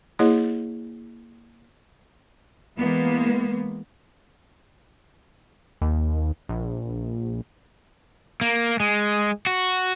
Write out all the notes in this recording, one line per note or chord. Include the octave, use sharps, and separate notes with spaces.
A#3 E4 G#4 C#5 D#5
E3 G#3 A#3 B3
D#2
A#1
A#3
G#3
F#4